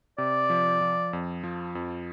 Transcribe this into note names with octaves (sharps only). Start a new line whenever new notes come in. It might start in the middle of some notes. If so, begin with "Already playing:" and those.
C3 D5
F3
F3
F2
F3
F2